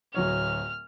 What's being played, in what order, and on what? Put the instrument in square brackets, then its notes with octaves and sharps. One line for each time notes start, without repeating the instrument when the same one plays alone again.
[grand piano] D1 F#3 C#5 [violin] F6